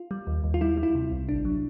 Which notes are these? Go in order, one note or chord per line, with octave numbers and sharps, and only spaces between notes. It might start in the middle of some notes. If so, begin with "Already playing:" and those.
Already playing: F4
G3
D#2
D#2
F4
G3 E4
G3
E4
C3
C2
A1 D4
F#3